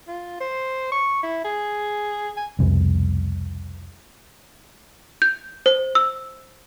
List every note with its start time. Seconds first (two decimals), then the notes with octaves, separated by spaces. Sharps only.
0.08 F4
0.40 C5
0.91 C#6
1.23 E4
1.44 G#4
2.37 G#5
2.59 C2 F2 B2
5.22 G6
5.66 C5
5.95 E6